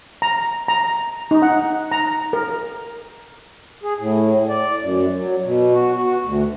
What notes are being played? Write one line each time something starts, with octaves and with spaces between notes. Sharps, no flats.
A#5
A#5
D#4
F#5
A#5
A#4
G#4
A2
D5
F#2
F#3
B2
F#4
F#4
D2